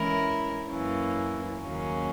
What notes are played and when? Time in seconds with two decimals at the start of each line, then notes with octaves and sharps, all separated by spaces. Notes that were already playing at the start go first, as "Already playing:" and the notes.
Already playing: E3 G#3 C#4 E4 A#4
0.68 F#2 E3 A#3 C#4
1.61 D#2 C#3 F#3 A#3 C#4